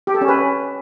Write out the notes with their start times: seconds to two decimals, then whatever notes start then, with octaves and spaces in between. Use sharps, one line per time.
0.07 G4
0.14 A4
0.21 C#4
0.28 B4